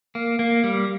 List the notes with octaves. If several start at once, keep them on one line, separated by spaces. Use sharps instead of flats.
A#3
A#3
G3